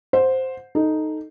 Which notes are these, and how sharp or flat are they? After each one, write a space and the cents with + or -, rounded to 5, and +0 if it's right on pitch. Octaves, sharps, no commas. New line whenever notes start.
C5 +0 F#5 -25
D#4 +0 A4 +0